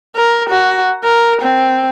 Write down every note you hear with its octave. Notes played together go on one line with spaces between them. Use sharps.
A#4
F#4
A#4
C4